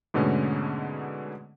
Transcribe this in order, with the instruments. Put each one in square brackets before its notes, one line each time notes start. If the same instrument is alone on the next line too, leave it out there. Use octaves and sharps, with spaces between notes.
[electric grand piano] G#2 B2 D3 A3 B3 C#4